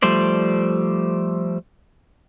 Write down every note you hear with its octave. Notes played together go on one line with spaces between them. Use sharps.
F3 G3 A3 C5 D5